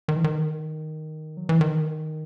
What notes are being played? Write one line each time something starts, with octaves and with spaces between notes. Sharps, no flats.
D#3
E3
D#3
F#3
E3
D#3